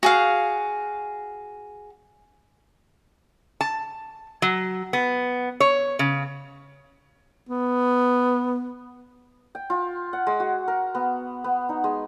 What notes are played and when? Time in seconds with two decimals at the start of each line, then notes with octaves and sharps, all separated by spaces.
0.03 F#4 G#4 F5
3.61 A5
4.42 F#3
4.93 B3
5.60 C#5
5.99 C#3
7.49 B3
9.55 G5
9.70 F4
10.13 F#5
10.27 G#3
10.40 F#4
10.68 A#4
10.95 B3
11.44 B3
11.69 D#4
11.84 G#3